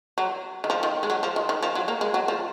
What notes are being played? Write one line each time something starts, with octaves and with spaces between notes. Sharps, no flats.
F#3
D#3
F3
D#3
G#3
F#3
F3
D#3
D#3
F3
F#3
A#3
G#3
F#3
F3